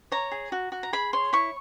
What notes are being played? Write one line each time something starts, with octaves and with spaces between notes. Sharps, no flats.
C#5 A#5
G#4
F#4
F#4
A#5
G#4 B5
C#5 C6
E4 C#6